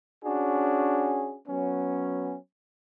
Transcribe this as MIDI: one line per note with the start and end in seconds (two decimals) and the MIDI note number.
0.24 1.37 61
0.24 1.37 62
0.24 1.37 66
0.24 1.37 68
1.48 2.36 54
1.48 2.36 59
1.48 2.36 61